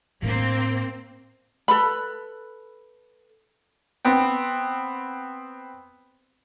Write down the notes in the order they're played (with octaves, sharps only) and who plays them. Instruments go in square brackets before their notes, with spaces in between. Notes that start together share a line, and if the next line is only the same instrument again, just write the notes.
[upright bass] A2 D4 [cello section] A#3 C4
[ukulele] A4 B4 B5
[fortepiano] B3 C4 G5